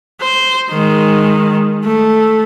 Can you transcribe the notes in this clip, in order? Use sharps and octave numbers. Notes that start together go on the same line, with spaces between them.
C5
D#3 G#3
A3